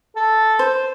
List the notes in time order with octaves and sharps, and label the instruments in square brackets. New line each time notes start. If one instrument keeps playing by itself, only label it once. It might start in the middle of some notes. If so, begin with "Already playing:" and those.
[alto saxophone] A4
[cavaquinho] C5